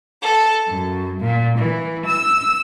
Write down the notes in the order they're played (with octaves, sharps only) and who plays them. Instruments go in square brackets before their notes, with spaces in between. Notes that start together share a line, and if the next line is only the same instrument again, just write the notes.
[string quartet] A4
F#2
A#2
E3
E6